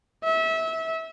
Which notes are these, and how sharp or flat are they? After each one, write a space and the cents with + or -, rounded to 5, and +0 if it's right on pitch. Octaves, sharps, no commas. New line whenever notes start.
E5 -25